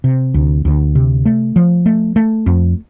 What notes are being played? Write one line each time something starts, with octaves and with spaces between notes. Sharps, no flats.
C3
D2
D2
C3
A3
F3
A3
A3
F2